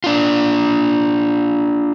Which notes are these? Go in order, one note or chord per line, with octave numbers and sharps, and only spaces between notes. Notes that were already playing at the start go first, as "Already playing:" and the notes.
D4 F4